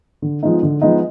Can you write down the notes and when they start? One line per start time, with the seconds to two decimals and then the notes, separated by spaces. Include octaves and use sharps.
0.22 D3
0.43 F3 G#3 B3 D#4
0.63 D3
0.82 F3 G#3 B3 D#4